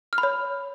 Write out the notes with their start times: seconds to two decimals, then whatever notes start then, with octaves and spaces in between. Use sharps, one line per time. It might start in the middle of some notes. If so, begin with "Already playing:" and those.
0.13 F6
0.18 B5
0.23 C#5